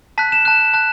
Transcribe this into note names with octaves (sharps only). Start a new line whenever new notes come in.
A5 F#6 B6
E7
A5 F#6 E7
A5 F#6